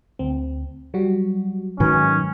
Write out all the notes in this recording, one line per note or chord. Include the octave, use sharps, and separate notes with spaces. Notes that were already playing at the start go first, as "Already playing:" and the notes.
D2 C4
F#3 G3 F#4
G#2 D#3 F#3 C#4 B4 G#5